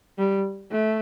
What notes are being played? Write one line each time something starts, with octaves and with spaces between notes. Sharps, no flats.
G3
A3